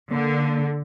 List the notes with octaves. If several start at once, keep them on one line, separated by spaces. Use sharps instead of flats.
D3 A#3